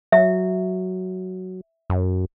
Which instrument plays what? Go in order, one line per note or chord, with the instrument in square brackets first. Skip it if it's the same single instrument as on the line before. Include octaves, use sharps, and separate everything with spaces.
[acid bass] F#3 [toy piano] E5
[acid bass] F#2